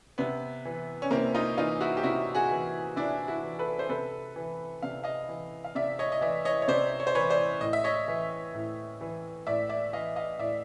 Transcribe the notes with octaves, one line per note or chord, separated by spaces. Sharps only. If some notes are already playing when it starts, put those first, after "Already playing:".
C3 B3
E3
C#4
C3 A#3 C4
D#4 F4
E3 D#4 F4
E4 F#4
G4
C3 E4 F#4
F#4 G#4
E3
C3 D4 E4
E4 F#4
E3
A4 B4
C5
C3 A4 B4
E3
C3 F5
D#5 F5
E3
F5
C3 D5 E5
C#5 D#5
D#5
E3 D5 E5
C#5 D#5
C#5
C3 C5 D5
C#5
C5
E3 B4 C#5
C5 D5
A2 D#5
E5
C#5 D#5
E3
A2
E3
A2 D5 E5
D5 E5
E3 D#5 F5
D#5 F5
A2 D5 E5